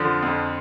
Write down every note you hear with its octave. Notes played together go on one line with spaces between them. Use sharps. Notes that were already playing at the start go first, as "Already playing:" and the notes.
Already playing: F2 D3 F3
F2